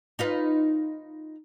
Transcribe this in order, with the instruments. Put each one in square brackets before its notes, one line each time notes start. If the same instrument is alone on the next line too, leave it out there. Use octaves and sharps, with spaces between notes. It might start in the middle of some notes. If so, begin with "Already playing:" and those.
[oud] D#4 F4 B4